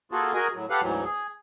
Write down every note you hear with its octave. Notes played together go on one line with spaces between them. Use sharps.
A#3 F4 F#4 G#4 A4
F#4 G#4 A#4 D#5 G#5
A2 F#3
G4 A4 B4 F5 F#5
D2 G#2 E3 F#3
G#4